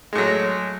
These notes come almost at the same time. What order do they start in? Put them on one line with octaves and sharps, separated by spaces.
G#3 A2 F#3